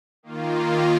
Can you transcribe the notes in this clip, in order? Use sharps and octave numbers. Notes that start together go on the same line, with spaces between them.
D#3 A#3 F4